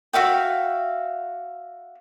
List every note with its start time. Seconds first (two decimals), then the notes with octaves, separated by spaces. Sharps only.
0.13 F#4 E5 F5 G5